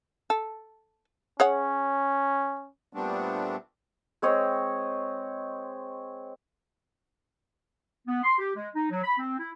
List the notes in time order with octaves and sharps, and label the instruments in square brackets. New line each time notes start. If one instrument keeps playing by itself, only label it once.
[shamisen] A4
[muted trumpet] C#4 [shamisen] G#4 C#5 F#5
[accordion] A#2 G3 A3 B3 C4 D4
[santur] G#3 C4 C#5 D#5
[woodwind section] B3
C6
G4
G#3
D#4
F#3
B5
C4
E4